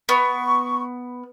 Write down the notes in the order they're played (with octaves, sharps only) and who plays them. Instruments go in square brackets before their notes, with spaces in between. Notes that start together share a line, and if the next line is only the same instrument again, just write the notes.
[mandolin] B3 [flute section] C#6